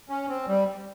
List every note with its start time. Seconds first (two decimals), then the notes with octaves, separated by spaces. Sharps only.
0.09 C#4
0.29 C4
0.47 G3